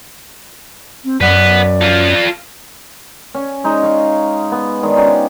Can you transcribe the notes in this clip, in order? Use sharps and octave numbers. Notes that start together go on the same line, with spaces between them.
C4
F#2 B4 D5 F#5
F4 A4
C#4
G#3 D#4
F5 C#6
B3
D#3 G#3 D4
C#4 D#4 F4 G4